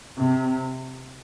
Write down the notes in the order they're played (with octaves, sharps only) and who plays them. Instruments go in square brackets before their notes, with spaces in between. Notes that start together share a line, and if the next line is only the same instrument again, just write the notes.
[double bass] C3